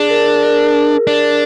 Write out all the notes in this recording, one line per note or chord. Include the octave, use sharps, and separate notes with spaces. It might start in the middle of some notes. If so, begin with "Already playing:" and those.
Already playing: D4 G#4
A#4
A#4
D4